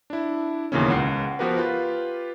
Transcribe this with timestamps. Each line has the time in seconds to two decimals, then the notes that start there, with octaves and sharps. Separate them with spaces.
0.10 D4 E4
0.72 D#2 A#2 C#3 E3 B3 C#4
0.90 C#2 F#5 C7
1.39 F3 B3 F#4 G4 A#4 B4
1.57 F4 G4 B4